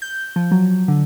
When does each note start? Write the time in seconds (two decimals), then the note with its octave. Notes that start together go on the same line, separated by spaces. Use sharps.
0.02 G6
0.36 F3
0.51 F#3
0.88 D3